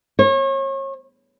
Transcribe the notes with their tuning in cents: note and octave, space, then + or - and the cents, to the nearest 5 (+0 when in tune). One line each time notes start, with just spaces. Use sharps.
C#5 -35